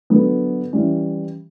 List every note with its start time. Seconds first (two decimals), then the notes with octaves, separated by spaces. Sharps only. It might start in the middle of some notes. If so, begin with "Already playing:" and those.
0.10 D3 F#3 B3
0.73 E3 G3 C#4